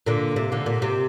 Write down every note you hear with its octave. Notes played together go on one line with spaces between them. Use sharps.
A#2 D3
C3
A#2 D3
A#2
C3